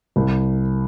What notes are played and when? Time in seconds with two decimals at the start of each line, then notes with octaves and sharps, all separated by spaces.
0.16 C2